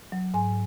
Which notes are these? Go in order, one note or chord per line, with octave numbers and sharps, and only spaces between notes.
F#3
G#2 G#5